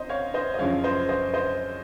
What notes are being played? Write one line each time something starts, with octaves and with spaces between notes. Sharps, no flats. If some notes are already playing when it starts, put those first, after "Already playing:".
Already playing: C3 C5 D#5
C#5 F5
C5 D#5
D#5
F#2 C#3 F3 C#5 F5
C5 D#5
C5 D#5
C5 D#5